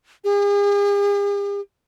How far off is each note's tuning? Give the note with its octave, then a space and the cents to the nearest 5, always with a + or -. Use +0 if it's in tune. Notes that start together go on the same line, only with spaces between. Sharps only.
G#4 -45